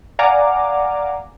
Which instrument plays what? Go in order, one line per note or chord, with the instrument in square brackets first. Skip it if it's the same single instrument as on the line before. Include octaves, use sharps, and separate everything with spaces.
[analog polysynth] D5 F5 F#5 G#5 A#5 D6